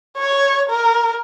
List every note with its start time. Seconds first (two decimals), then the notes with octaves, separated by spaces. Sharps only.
0.18 C#5
0.70 A#4